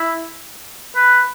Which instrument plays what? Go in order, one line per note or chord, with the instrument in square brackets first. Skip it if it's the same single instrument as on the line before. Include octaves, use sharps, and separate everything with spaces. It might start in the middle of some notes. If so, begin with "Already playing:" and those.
Already playing: [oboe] E4
B4